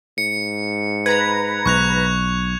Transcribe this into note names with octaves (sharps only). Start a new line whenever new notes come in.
G#2 C#7
B4 A#5 B5 G#6
B1 C#6 F#6 F7